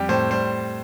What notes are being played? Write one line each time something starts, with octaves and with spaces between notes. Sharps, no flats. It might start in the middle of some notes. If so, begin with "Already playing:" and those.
Already playing: F2 G3 G4
A2 C5
G3 C5